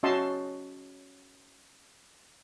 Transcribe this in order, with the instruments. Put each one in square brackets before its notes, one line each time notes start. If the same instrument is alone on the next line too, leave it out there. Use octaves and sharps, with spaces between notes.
[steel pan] C#4 F#4 D#5 E5 A5 C6